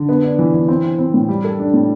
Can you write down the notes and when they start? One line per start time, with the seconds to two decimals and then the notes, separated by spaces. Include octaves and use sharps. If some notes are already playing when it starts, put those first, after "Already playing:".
Already playing: D3
0.09 B3
0.24 D4
0.39 E3
0.54 E3
0.68 C4
0.84 C4
0.99 C4
1.14 A2
1.29 G3
1.44 A4
1.59 D4
1.74 A2